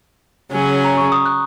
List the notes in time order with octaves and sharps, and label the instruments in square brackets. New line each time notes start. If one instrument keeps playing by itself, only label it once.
[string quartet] C#3 F#3 C#4 G#4
[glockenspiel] A#5
C#6
D#6
F#6